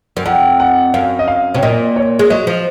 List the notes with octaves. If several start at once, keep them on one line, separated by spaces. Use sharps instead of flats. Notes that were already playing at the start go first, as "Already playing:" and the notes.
F#2
F2 F#5
F#5
F#2 F5
D#5
F5
C3 C#5
A#2 D#5
C#5
G#3
F#3 D#5
F3